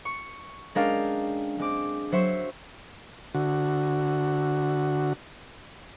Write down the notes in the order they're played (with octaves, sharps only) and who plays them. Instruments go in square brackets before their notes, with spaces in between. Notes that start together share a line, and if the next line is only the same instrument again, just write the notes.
[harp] C#6
G#3 C#4 D4 A#4 F5 G5
G#3 C4 D6
F#3 C5 E5 C#6
[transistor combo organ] D3 F#4